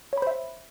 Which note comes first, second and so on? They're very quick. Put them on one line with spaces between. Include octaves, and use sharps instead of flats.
C#5 B5 C5 E5